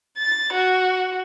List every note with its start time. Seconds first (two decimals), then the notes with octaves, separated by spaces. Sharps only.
0.18 A6
0.53 F#4